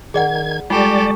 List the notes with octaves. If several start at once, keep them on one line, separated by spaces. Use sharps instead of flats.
D#3 G#4 D5 F#5 G#6
G3 G#3 F4 G4 A4 D5 C#6